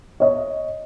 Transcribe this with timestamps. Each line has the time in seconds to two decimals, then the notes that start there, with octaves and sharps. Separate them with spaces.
0.20 C#5 D#5